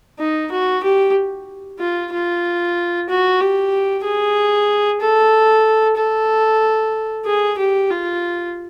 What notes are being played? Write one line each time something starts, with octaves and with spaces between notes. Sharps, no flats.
D#4
F#4
G4
F4
F4
F#4
G4
G#4
A4
A4
G#4
G4
F4